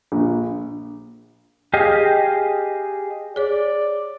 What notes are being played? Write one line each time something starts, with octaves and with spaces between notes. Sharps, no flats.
A#1
G4 G#4 D#5 F5
G#4 C#5 D5